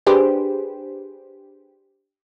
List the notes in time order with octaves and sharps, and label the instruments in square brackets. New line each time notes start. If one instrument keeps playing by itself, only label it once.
[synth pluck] D4 G4 G#4 B4 C5